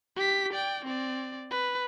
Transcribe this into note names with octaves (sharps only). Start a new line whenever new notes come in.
G4 B6
D5 G5
C4 D5
B4